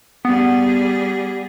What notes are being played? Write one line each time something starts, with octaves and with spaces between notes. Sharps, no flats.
G3 B3 G#4